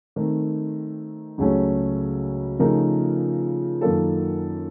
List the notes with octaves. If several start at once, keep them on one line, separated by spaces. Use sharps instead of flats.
D#3 A3 C4
C#2 C#3 F#3 A3 C#4
C#3 F3 A3 D#4 A#4
F#2 D#3 A#3 F4 A4